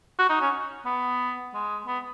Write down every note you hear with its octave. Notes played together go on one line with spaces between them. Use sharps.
F#4
D#4
C#4
B3
G#3
B3